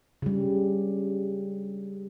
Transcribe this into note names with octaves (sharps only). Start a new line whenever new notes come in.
C#3 G3